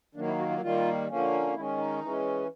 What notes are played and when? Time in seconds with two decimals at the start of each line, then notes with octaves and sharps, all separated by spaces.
0.15 D#3 F#3 A#3 D4
0.27 E4
0.39 F#4
0.50 F4
0.61 D#3 G3 A#3 F4
1.08 D3 F3 A#3 C#4
1.54 D#3 G#3 C#4 E4
1.78 D#4
2.01 E3 G#3 C#4